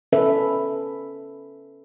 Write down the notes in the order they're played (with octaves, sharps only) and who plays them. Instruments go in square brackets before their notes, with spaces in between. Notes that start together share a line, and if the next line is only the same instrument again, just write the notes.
[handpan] C#4 A4 B4 E5